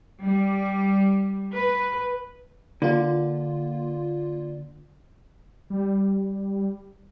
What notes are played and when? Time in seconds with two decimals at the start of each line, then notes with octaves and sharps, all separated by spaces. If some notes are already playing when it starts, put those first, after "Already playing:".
0.21 G3
1.53 B4
2.82 D3 A#3 F4
5.70 G3